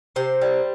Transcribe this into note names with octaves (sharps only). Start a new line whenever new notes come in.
C3 C5
G3